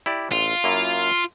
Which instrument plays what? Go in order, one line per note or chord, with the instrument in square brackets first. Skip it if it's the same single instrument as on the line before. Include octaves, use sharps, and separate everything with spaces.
[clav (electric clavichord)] E4 G4 D5
[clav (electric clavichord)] A1 [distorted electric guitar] F4
[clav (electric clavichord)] F#2 A#3 E4